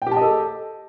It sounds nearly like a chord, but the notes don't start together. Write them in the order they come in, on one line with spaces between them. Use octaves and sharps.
G5 G4 A5 D#5 A4